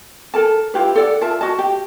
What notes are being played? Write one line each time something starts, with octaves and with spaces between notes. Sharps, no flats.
A4 A#4 A5
E4 F4 G4 B4
A4 D5 F#5
F4 A#4 E5 A5
F#4 D#5 A5
G4